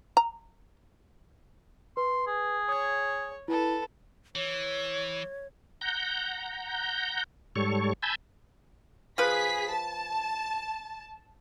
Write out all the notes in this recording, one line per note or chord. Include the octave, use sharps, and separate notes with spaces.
A#5
B4 C6
G#4
C#5 D#6 G#6
E4 A4 B4
E3 C#5
F#5 A#5 G6
G#2 G3 A4 C#5 C#6
G#5 A5 B5 E6 G6
F3 G#4 B4 B6
A5